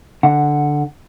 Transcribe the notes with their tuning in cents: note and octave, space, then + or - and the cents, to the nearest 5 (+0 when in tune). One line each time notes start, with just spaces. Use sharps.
D3 +0 F#5 +0